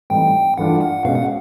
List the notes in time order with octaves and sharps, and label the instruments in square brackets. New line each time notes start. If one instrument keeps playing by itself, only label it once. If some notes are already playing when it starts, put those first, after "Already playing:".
[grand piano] A2 E3 G3 C4 D#4 [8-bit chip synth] G5
[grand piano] G2 E3 A3 D4 F4 [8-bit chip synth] F#5
[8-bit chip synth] F#5
[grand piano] B2 G#3 C#4 [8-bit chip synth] F5
[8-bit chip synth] F#5